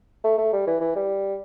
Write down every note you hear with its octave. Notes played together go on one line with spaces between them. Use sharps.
A3
A3
G3
E3
E3
G3